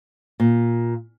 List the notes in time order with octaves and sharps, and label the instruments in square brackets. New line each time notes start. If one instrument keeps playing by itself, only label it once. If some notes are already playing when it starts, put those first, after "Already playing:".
[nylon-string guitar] A#2